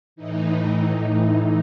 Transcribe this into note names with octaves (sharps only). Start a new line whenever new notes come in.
A2 E3 D#4